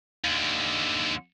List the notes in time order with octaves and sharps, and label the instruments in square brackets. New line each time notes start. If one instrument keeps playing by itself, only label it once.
[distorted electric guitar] D#2 D3